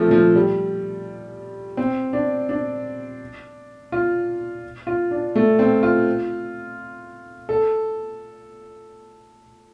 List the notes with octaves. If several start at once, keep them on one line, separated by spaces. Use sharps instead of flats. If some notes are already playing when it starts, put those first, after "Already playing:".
Already playing: F3 A3 C4
F3
G3
C4
D4
D4
F4
F4
D4
A3
C4
F4
A4